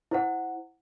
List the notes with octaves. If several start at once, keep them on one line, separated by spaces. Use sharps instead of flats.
E4 C5 F#5